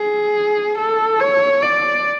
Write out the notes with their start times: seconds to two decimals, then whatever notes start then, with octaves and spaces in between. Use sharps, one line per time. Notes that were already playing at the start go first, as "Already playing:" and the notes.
Already playing: G#4
0.78 A4
1.20 C#5
1.62 D5